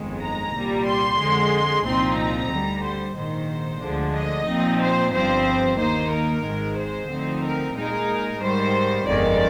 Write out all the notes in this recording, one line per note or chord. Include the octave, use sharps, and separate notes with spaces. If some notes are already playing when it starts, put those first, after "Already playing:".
Already playing: G1 F2 D#3 G#3
A#5
C2 A#2 G3
C6
F2 D3 G#3
C2 A#2 F3 C4 D#4 C6
A#5
D2 D3 G3
C5
A#1 G#2 D#3 C5
D2 D3 F3 G#3 D4
D#5
A#2 F3 C4 D#4
C5
G1 G2 F3 C4 C5
D#2 D#3 A#3 D#4 C5
A#4
G#1 G#2 D#3 G#3
C5
D2 D3 F3 C4 D#4
A#4
A#2 G#3 D#4 A#4
G#2 D#3 G3 C5
G1 F2 D#3 G#3 D5